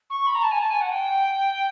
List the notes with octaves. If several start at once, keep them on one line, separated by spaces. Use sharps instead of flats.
C#6
B5
A#5
A5
G#5
A5
G#5
F#5
G5